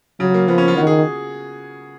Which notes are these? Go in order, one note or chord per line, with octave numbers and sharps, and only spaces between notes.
C#3 F#3
A#3
F3 B3
C#4
F4
D#3 F#4
G#4